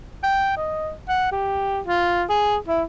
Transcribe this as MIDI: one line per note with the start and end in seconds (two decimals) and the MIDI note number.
0.23 0.54 79
0.57 0.91 75
1.08 1.30 78
1.32 1.80 67
1.86 2.23 65
2.29 2.56 68
2.68 2.82 64